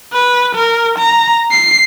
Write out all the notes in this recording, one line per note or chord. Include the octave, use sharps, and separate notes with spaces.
B4
A#4
A#5
C7